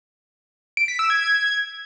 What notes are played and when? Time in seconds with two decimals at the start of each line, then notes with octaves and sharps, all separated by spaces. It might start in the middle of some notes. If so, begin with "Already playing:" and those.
0.77 D7
0.88 B6
0.99 E6
1.10 G#6
1.21 G#6